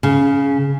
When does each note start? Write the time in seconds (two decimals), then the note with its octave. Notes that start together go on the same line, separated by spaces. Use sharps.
0.03 C#3